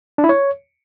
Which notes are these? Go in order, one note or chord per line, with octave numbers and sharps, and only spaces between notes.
D4
E4
C#5